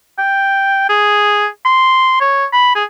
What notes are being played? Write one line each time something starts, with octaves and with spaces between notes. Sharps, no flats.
G5
G#4
C6
C#5
B5
G#4